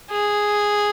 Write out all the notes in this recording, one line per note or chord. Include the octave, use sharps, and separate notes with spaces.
G#4